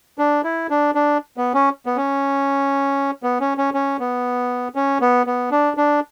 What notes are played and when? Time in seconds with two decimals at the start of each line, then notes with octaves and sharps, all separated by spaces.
0.18 D4
0.44 E4
0.70 D4
0.95 D4
1.37 B3
1.54 C#4
1.86 B3
1.97 C#4
3.23 B3
3.40 C#4
3.58 C#4
3.74 C#4
4.00 B3
4.75 C#4
5.01 B3
5.27 B3
5.51 D4
5.77 D4